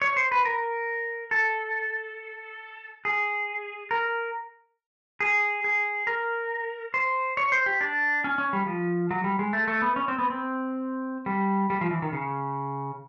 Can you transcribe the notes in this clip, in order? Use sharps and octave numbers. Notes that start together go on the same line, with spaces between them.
C#5
C5
B4
A#4
A4
G#4
A#4
G#4
G#4
A#4
C5
C#5
C5
G4
D4
C#4
C#4
G3
F3
F#3
G3
G#3
A3
A3
B3
C#4
C4
B3
C4
G3
G3
F3
E3
D#3
C#3